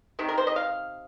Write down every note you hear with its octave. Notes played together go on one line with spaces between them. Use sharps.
C3 D#3
A#4
C5
D#5
F5